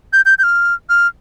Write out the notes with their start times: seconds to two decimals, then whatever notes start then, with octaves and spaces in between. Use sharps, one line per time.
0.13 G6
0.26 G6
0.39 G6
0.43 F6
0.89 F6